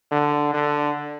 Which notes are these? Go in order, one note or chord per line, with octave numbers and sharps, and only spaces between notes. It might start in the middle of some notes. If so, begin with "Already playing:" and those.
D3
D3